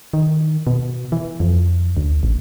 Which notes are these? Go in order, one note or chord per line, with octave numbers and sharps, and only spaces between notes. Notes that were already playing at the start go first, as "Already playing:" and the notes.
D#3
B2
E3
F2
D2
A1